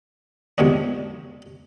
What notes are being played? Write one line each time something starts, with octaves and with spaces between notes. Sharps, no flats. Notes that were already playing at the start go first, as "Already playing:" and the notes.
B1 G#2 C3 F3 D4